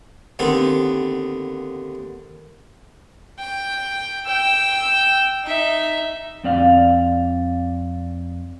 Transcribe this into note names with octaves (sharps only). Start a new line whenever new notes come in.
D#2 D3 B3 C4
G5
G5 E6
D#4 E5
F2 C4 D5 F5